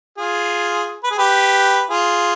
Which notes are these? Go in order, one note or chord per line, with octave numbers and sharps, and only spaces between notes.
F4 G#4
B4
G#4
G4 B4
F4 G#4